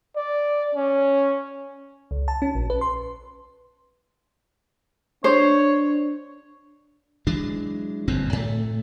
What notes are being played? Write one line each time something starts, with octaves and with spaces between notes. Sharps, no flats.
D5
C#4
C#2
A5
C#4
A#1
B4
C6
D4 C5 C#5
E3 F#3 G#3 D4
G1 F#2 A#2 C4
A2 A3